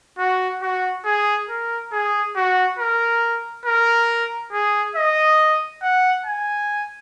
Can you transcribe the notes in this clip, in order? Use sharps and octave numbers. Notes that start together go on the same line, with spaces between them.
F#4
F#4
G#4
A#4
G#4
F#4
A#4
A#4
G#4
D#5
F#5
G#5